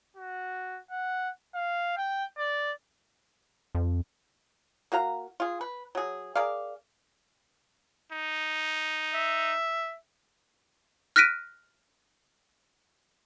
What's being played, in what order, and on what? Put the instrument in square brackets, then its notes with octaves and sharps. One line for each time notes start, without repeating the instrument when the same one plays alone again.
[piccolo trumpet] F#4
F#5
F5
G5
D5
[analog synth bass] F2
[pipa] A#3 F#4 F5 A#5
F4 G#4
B4
F#3 G#4
G#4 A#4 D5 F5
[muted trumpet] D#4
[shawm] E5
[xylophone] F6 F#6 A#6 B6 D7 D#7